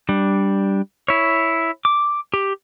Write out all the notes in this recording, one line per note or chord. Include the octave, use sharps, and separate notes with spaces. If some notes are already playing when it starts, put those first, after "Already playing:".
G3 D4
E4 C#5
D6
G4